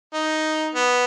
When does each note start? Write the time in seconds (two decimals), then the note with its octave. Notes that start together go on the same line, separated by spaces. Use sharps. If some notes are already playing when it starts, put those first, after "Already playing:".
0.13 D#4
0.75 B3